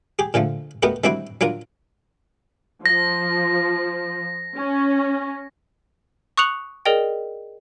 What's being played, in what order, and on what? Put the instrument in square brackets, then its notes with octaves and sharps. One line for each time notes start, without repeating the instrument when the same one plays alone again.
[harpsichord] G4 G#4
A#2 D3 F3 A3
A3 B3 D#4 F#4 G4 A#4
D#3 G3 C4 D4 E4 F#4
F#3 D4 F4 A#4
[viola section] F3 [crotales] A#6
[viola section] C#4
[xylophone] C#6 D#6 F#6 C#7 F7 F#7
G#4 A#4 D5 D#5 G5